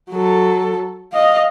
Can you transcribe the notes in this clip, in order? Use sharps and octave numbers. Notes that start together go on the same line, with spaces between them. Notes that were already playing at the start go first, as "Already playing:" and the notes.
F#3 A4
D#5 F5